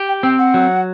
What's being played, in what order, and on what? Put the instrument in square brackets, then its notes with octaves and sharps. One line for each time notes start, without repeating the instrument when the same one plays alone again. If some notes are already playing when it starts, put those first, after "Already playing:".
Already playing: [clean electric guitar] G4
[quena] G5
[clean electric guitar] C4 [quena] G5
[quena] F#5
[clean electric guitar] F#3